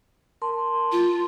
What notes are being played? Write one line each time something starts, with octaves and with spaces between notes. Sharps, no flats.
A#4 A5 C6
F4